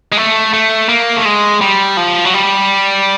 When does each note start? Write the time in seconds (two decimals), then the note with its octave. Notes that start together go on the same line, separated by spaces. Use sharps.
0.12 G#3
0.17 A3
0.53 A3
0.89 A#3
1.16 A3
1.25 G#3
1.61 G3
1.97 F3
2.25 F#3
2.34 G3